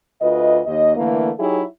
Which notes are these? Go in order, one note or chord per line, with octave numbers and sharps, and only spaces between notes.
D2 F4 B4 D#5
D#2 D#5
D3 E3 A3 A#3
F#3 D#4 E4 G4 G#4 C#5